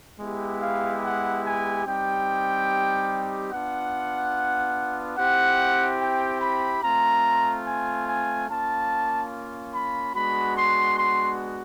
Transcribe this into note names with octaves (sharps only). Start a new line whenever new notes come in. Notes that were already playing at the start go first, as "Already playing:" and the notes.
G#3 B3 E4 G4
F5
F#5
G#5
G3 C4 D#4 G4 G5
B3 D4 F4 F#5
C4 E4 G4 F#5
G5
B5
A3 C4 F4 A#5
G#5
G#5
A#3 C#4 F4 A5
B5
G#3 B3 D4 F#4 B5
C6
C6